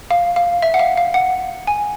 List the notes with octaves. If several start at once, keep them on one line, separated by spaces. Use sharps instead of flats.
F5
F5
E5
F#5
F5
F5
F#5
G#5